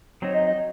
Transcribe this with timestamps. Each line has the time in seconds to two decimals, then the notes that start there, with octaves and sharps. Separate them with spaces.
0.22 F#3 C4 D#4 C#5
0.34 D#5
0.47 D#5